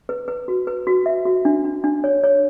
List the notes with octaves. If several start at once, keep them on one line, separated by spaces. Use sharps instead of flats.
B4
B4
F#4
B4
F#4
E5
F#4
D4
D4
D4
C#5
C#5